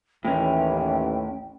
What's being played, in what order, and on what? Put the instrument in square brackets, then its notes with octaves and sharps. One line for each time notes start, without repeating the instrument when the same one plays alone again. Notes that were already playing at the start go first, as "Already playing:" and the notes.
[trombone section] A1 D#2 E3 [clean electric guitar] A2 C#4 [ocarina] G5